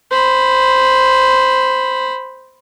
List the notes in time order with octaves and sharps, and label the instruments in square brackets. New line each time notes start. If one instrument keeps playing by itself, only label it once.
[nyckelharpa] C5 B5